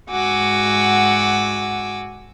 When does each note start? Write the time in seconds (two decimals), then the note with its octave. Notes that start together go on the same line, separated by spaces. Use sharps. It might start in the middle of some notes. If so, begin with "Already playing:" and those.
0.11 G#2 F#4 F#5 G#5 D6 E6